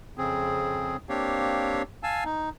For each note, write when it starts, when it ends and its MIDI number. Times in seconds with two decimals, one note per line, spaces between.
0.18 0.97 41
0.18 0.97 49
0.18 0.97 60
0.18 0.97 68
1.09 1.82 58
1.09 1.82 60
1.09 1.82 62
1.09 1.82 67
1.09 1.82 73
1.09 1.82 77
2.03 2.24 77
2.03 2.24 80
2.03 2.24 81
2.03 2.24 88
2.25 2.50 63